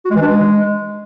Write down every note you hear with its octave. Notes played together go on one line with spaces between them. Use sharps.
F#4
G#3
E3
D4
G#3